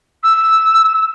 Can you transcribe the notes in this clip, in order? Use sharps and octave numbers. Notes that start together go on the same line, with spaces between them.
E6